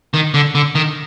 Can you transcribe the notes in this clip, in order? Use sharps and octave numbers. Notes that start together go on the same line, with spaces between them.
D#3
D3
D3
D#3